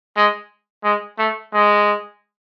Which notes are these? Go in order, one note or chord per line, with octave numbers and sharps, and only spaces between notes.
G#3
G#3
A3
G#3